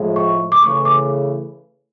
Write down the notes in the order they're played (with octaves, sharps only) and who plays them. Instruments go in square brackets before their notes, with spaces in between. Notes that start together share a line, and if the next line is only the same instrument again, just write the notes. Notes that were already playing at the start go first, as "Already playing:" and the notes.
Already playing: [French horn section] A2 F3 G#3
[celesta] C#6
D6
[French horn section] C#3 E3 A3 [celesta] C#6
[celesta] D6